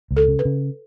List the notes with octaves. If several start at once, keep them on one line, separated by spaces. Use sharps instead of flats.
C#2
A4
C#3
B4
C#3